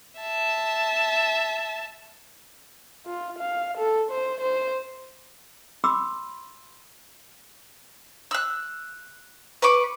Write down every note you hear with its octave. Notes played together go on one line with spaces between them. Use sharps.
E5 A5
F4
F5
A4
C5
C5
F#4 B5 C6 D6 E6
E6 F#6
B4 B5 C#6 D6